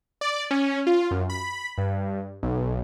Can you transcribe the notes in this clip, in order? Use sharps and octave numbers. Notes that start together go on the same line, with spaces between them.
D5
C#4
F4
F#2
B5
G2
B1